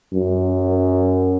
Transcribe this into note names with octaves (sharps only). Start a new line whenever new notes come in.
F#2